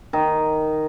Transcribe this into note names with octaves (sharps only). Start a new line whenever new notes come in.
D#3